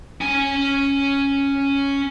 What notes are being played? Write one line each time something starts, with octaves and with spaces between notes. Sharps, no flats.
C#4 G#5